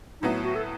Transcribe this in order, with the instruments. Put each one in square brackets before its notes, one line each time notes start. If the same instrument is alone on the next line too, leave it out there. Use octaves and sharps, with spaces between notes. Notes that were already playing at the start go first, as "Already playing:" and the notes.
[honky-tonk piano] A2 F#3 B3 [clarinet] D#4
[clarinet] E4
F#4
A4